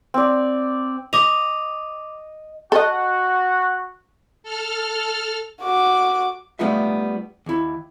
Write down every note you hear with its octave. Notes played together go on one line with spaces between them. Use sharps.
C4 D5
D#5 D6 F7
F#4 A4 D#5
A4 F6
F#4 D6
G3 A3 B3 D#4 F4 E5
D#2 E4